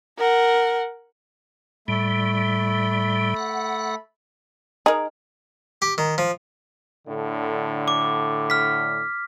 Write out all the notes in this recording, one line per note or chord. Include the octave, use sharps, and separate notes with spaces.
A#4 F#5
A2 G3 A3 B5
F#5
D#4 G#4 A#4
G4
D#3
F3
A2 D3
D6
F6 B6